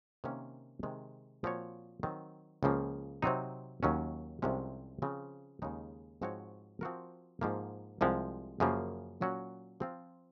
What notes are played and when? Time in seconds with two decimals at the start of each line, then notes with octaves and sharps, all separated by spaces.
0.24 C3 D#3 A#3 C#4
0.83 C3 D#3 G#3
1.44 A#2 F3 C4 F#4 C#5
2.03 D#3 F#3 C4
2.63 C#2 C#3 F3 A#3
3.22 C3 F#3 C4 D#4
3.83 D#2 D#3 F#3 C#4
4.42 C2 C3 F3 G#3 C#4
5.02 C#3 F3 C4
5.62 D#2 C#3 G#3 D#4
6.22 G#2 F3 C4 F#4 C#5
6.81 F3 C4 F#4 A#4
7.41 G#2 F3 A#3
8.01 C2 C3 F3 G#3
8.60 F#2 C#3 F3 A#3
9.21 A#2 F#3 C#4 F#4
9.80 F3 C4 F4